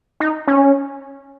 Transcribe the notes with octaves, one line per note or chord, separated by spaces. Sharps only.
D#4
C#4